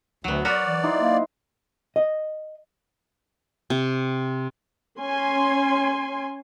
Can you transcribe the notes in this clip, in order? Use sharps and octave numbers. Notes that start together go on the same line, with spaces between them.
D2 F#3 B3
F#4 A#4 B4 D5
E3
D#4 E4 C5
A#3
D#5
C3
C#4 G#5 C6